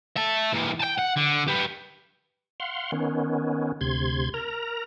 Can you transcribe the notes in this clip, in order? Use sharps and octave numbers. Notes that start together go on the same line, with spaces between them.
E5 A5
E3 A#3
G5 A5
F#5
D3
G4 B4
F5 F#5 C6
D#3 B3 C#4
D2 C3 C6 G#6
A#4 A#5